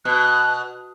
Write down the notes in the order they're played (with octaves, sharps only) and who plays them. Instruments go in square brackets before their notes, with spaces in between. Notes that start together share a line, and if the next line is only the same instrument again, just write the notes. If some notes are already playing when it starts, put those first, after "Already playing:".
[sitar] B2 [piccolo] F#6